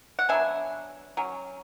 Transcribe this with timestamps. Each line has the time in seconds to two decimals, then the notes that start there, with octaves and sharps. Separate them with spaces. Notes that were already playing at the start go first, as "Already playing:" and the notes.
0.19 F#5
0.29 F#3 B3 D4 E5 G#5
1.17 F#3 C#4